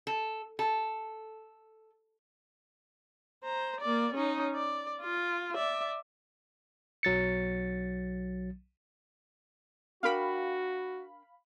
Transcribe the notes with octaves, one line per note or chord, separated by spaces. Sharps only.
A4
A4
C5 A#5
A#3 D5
C#4 D#4
D5
F4
D5 E5
B1 F#3 A6 C#7
D4 F#4 A#4 F5 G5 B5